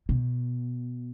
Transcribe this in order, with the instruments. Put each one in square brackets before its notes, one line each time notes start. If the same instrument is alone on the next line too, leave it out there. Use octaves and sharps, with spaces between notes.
[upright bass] B2